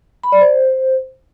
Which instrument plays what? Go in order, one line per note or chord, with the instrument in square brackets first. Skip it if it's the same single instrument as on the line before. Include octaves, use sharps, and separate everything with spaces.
[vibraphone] B5
D5
C5